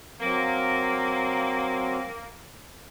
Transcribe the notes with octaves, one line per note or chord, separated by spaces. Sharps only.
F#3 A#3 C4